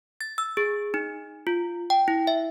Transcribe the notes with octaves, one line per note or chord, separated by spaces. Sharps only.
A6
E6
G#4
D#4
F4
G5
E4
E5